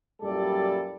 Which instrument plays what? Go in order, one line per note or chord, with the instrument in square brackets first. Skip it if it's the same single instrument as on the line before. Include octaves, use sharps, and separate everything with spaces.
[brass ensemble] F#2 A#2 G3 E4 A4 D5